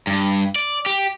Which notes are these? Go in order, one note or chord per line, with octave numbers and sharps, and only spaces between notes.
G2
D5
G4